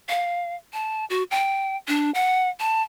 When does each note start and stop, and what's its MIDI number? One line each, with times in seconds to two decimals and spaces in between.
0.09 0.56 77
0.73 1.05 81
1.10 1.23 66
1.31 1.76 79
1.88 2.11 62
2.15 2.49 78
2.60 2.82 81